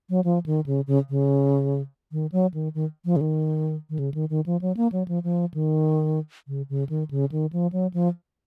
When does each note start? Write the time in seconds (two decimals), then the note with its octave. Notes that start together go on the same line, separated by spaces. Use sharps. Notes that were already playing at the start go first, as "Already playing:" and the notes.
0.10 F#3
0.24 F3
0.46 D#3
0.66 C#3
0.87 C#3
1.10 C#3
2.12 D#3
2.32 F#3
2.54 D#3
2.75 D#3
3.05 F3
3.16 C#3
3.21 D#3
3.90 D#3
3.99 C#3
4.14 D#3
4.30 D#3
4.46 F3
4.61 F#3
4.77 A#3
4.92 F#3
5.08 F3
5.24 F3
5.54 D#3
6.48 C#3
6.70 C#3
6.89 D#3
7.11 C#3
7.32 D#3
7.53 F3
7.72 F#3
7.94 F3